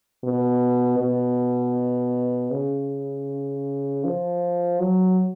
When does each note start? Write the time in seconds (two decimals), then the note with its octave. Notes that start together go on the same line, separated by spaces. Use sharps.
0.24 B2
1.00 B2
2.52 C#3
4.05 F3
4.80 F#3